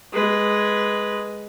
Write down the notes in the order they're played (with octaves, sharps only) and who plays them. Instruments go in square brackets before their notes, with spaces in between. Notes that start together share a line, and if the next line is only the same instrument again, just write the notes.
[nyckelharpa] G#3 B4